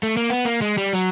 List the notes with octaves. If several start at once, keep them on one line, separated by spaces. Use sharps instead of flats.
A3
A#3
B3
A#3
G#3
G3
F#3